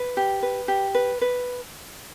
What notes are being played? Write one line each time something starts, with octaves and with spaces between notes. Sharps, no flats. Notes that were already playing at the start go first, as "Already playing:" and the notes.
Already playing: B4
G4
B4
G4
B4
B4